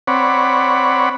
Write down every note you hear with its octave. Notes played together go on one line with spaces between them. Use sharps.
C4 C#5 D5 F#5 B5